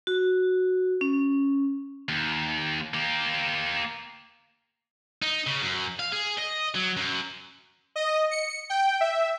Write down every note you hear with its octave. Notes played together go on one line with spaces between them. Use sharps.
F#4
C#4
D#2
A#3 G4
D#4
C#3
F#2
F5
G#4
D#5
F#3
F#2
D#5
C#7
G5
E5